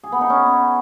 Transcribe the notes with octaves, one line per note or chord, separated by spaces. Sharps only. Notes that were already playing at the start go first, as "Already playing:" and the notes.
G#4
B3
D#4
C#4